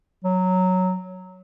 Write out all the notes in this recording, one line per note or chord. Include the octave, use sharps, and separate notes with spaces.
F#3